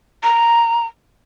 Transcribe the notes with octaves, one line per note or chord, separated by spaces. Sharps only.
A#5